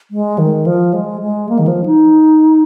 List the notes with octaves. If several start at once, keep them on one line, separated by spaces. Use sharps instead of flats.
G#3
D#3
F3
G#3
G#3
A#3
D#3
F3
D#4